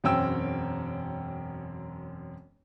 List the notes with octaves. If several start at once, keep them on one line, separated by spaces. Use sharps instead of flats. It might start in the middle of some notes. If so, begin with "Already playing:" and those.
E1 F#2 C4 C#4 G5 E6